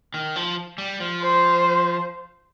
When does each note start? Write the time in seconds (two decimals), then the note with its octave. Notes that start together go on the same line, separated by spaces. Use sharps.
0.14 D#3
0.36 F3
0.78 G3
1.00 F3
1.21 C5